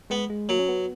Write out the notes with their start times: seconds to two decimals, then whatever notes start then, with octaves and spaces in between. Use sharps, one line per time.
0.10 G#3 B3
0.30 G#3
0.49 F#3 A#3
0.59 C#4
0.68 B3